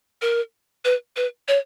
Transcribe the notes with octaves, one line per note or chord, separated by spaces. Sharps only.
A#4
B4
B4
C#5